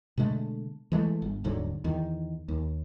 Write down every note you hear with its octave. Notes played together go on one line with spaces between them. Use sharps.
B2 D3 G#3 A3
E3 G#3 A3
G1
D#1 G#2 D3 F#3
E2 D#3
D#2